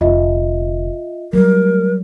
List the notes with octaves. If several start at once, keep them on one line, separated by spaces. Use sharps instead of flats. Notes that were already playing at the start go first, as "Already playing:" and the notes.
F1 D3 F4 D#5 E5
F#3 G3 A3 A#4